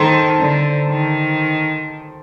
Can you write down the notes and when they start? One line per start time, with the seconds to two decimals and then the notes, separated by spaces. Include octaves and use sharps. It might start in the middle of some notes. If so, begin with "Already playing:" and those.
Already playing: D#3 A4 C5 A5 A#5 C6
0.39 D3
0.89 D#3